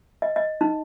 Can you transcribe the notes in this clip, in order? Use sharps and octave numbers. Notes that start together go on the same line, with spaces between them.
D#5
D#5
D#4